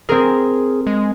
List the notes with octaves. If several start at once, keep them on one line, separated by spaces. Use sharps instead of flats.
C4 G#4 A#4
G#3